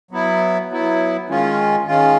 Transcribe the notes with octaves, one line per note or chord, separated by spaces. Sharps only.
F#3 B3 E4
F#3 B3 E4
D#3 G#3 C#4 F4
D#3 G#3 C#4 F4